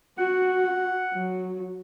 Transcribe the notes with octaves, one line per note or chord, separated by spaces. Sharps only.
F#4 F#5
F#3